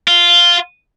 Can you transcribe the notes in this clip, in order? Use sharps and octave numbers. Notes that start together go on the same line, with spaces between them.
F4